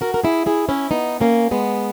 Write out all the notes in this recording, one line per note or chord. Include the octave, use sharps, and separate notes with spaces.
F#4 A#4
A#4
E4 G#4
E4 G#4
C#4 E4
B3 D#4
A#3 C#4
G#3 B3